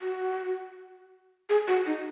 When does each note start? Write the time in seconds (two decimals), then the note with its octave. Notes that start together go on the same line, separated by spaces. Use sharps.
0.01 F#4
1.50 G#4
1.68 F#4
1.86 D#4